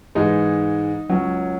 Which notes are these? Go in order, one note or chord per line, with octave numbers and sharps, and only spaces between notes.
G#2 E3 G#3 D#4
C#2 C#3 F#3 C#4